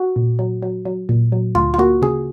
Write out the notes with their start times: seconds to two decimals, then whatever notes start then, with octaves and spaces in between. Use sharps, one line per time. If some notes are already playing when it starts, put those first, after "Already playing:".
Already playing: F#4
0.16 A#2
0.39 F#3
0.62 F#3
0.85 F#3
1.09 A#2
1.32 F#3
1.55 D2 F4
1.74 F4
1.78 A#3 F#4
2.02 C#3 G#4